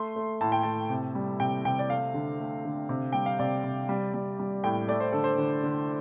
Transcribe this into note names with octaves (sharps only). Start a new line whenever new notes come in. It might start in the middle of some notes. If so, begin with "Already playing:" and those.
Already playing: A3 C6
A3
A2 A5
G5
A2 A5
C3
G3
C3 G5
C3 G5
D5
A3 F5
D3
A3
D3
C3
G3 G5
F5
C3 D5
C3
G3
G3
G3
A2 G5
A3 D5
C5
D3 A4
C5
D3
D3